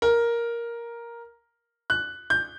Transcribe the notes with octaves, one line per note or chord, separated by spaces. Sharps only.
A#4
F#6
G6